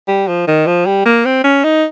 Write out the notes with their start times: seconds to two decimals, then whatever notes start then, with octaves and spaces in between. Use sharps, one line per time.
0.08 G3
0.28 F3
0.47 D#3
0.67 F3
0.87 G3
1.05 A#3
1.25 C4
1.44 C#4
1.64 D#4